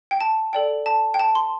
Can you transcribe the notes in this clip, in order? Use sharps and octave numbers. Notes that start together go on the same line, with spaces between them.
G5
A5
A4 D5 G5
A5
G5
A5
C6